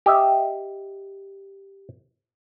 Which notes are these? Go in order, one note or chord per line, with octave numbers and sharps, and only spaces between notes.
G4 D#5 E5